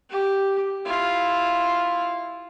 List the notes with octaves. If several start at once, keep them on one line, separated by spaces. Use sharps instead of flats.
G4
E4 F4